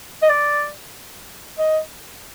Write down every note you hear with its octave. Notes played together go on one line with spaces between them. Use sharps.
D#5
D5
D#5